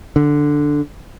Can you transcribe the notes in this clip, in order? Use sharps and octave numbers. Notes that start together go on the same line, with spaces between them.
D3